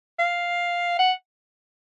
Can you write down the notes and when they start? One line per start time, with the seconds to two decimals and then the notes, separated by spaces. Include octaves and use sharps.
0.19 F5
0.99 F#5